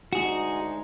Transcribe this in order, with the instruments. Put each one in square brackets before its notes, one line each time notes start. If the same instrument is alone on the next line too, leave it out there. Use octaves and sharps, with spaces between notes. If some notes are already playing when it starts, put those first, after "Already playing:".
[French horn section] D2 G#3 D#4 [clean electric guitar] F#4 G#4